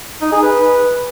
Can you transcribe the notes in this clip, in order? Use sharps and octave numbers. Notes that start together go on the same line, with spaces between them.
D#4
G#4
B4